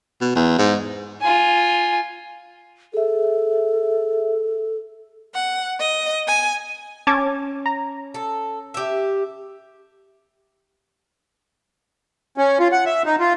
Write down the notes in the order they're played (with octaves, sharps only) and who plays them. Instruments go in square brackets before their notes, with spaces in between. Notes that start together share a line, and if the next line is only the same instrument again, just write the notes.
[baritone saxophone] B2
E2
G#2
[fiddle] F4 G#5
[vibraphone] G#4 E5 [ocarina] A4
[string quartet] F#5
D#5
G#5
[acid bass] C#4 [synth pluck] A5 D6 G#6
[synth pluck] A#5
[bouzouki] A4
G4 E5
[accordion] C#4
F4
F#5
E5
D#4
F4